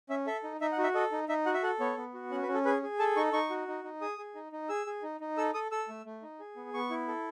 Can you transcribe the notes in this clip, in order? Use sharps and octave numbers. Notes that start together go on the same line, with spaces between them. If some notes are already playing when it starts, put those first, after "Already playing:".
C#4 E5
A4 E5
D#4
D#4 E5
F#5
F#4
E5
A4 D#5
D#4
D#4 E5
F#4 F#5
E5
A4 F#5
B3 C#5
B3
F#4
C#4 F#5
B4
C#4
A4
G#4 B4
G#4
A4 A5
D#4 C#6
D#4 C#6
F#4
D#4
D#4
G#4 D#6
G#4
D#4
D#4
G#4 E6
G#4
D#4
D#4
A4 E6
A4 D#6
A4 E6
A3
A3
D#4
G#4
B3
B3 C#6
E4
A4